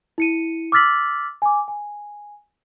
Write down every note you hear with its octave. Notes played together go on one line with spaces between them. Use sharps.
E4 C#7 D#7
D6 E6 F6 A6 B6 F#7
G#5 D6
G#5